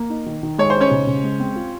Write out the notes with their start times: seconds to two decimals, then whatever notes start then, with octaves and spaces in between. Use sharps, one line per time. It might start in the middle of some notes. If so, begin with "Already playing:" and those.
Already playing: A#3
0.10 D#4
0.26 D#3
0.43 D#3
0.58 G#3 C#5
0.70 D#4 C5
0.81 C#4 C#5
0.91 C#3
1.07 C#3
1.23 G#3
1.40 C4
1.56 F4